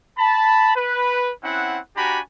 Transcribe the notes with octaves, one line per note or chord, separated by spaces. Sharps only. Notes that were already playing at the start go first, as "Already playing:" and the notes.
A5 B5
B4
C4 C#4 E4 F#5
D4 F#4 G4 G#5 A#5 B5